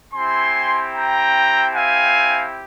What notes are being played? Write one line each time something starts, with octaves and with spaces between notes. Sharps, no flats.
C4 E4 G4 G#5 C6
G5 A#5
F5 G#5